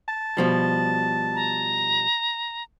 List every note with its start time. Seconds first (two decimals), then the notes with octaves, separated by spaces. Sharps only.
0.08 A5
0.37 B2 F3 G3
1.35 A#5